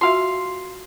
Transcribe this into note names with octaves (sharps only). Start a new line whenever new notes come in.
F4 F#4 E5 F5 C6